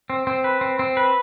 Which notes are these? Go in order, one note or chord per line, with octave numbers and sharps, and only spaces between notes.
C4
C4
B4
C4
C4
B4